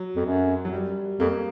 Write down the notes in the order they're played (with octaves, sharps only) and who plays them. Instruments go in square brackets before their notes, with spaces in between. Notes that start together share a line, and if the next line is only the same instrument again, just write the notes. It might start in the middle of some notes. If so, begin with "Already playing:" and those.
Already playing: [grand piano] F#3
[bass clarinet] F2
F#2
[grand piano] F#3
G3
[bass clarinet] F2 [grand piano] A#3